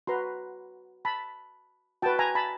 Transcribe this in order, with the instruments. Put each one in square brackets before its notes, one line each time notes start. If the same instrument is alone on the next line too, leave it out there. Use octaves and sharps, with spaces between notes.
[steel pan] F#4 B4 A#5 C6
A5 B5
F#4 B4 G5 A5
G#5 A#5
A5 B5